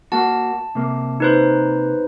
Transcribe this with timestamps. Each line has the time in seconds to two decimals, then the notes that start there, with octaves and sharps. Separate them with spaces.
0.12 A#3 F#4 A5
0.75 C3 A#3
1.20 D#4 B4 C5